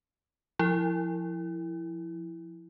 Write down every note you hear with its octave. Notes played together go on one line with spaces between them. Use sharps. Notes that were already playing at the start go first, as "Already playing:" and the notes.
F3 E4